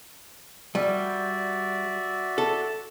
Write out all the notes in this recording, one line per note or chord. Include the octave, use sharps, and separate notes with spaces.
G3 F#4 D5 E5
A4